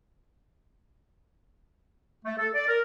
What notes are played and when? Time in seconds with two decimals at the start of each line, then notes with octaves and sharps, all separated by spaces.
2.25 A3
2.38 A4
2.54 D5
2.67 A#4